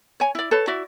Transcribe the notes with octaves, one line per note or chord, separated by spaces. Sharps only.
C#5 G#5
E4 D5
A4 B4 C#5
E4 F#4 D5 E5